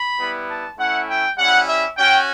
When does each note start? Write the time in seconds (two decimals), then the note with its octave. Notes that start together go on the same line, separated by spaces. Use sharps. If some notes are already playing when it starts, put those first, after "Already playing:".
Already playing: B5
0.18 G3 B3 E4
0.49 A5
0.78 A3 C#4 E4 F#5
1.08 G5
1.38 G3 C#4 E4 F#5
1.68 E5
1.98 C#4 F#4 G5